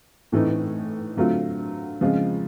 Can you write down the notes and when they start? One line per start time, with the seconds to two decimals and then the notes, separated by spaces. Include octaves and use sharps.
0.32 A2 E3 A3 C4 D#4
1.17 D3 F#3 A3 C4 F4
2.01 C#3 F3 G#3 C4 F4